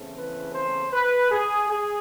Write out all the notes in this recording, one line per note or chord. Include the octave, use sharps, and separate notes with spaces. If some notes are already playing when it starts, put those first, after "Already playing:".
Already playing: E2 C#3 E3 A3 C4
B4
C5
B4
G#4
G#4